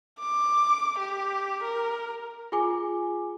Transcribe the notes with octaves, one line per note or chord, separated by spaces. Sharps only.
D6
G4
A#4
F4 G#4 G#5 D6